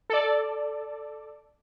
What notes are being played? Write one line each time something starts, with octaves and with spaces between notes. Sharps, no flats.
A4 D5